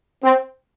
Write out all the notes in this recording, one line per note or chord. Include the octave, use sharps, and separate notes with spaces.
C4